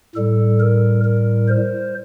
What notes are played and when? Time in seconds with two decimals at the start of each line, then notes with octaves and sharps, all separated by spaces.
0.16 A2 G3 A4
0.60 A#4
1.04 A#4
1.48 C5